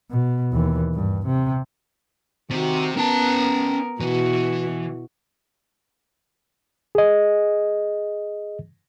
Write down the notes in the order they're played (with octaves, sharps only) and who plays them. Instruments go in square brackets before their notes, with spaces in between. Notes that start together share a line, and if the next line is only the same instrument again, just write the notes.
[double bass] B2
D#2 E3
G2
C3
[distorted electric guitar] C3 [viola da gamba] D#3 F#4
[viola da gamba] B3 A#4 [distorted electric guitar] C#4 A5
[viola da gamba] B2 E4 F#4 [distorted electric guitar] E3
[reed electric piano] G#4 D#5